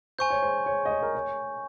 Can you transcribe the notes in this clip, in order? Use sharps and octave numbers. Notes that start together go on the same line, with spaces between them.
C5 G#5 C#6 G6
C#5
C5
C#5
D#5
C#5
A#4
C#5